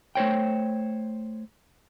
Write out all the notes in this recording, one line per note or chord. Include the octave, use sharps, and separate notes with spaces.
A3 C5 C#5 G5